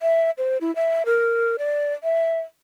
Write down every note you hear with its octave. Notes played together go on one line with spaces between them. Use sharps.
E5
C5
E4
E5
A#4
D5
E5